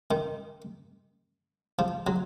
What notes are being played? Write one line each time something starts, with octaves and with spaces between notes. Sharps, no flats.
D#3
F3
F#3